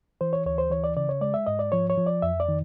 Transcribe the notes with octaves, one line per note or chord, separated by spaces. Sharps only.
E3 C5
C#5
D2 C#5
C5
E3 C#5
D5
C#3 D5
C#5
G#3 D5
E5
G#2 D#5
D5
F3 C#5
C#5
F3
D5
F2 E5
D5
D#3